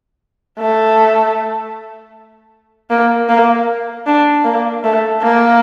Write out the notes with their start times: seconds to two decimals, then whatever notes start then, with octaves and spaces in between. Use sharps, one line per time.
0.59 A3
2.90 A#3
3.29 A#3
4.07 D4
4.44 A#3
4.84 A3
5.22 A#3